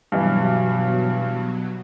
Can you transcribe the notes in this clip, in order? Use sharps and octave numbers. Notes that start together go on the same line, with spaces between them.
G2 B2 E3 F#3